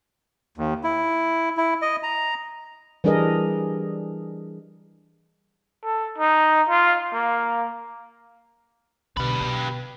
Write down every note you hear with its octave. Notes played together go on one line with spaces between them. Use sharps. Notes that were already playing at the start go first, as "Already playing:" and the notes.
D#2
E4
E4
D#5
A#5
E3 G3 D4 G#4 A#4 D#5
A4
D#4
F4
A#3
B2 D3 G4 B4
B2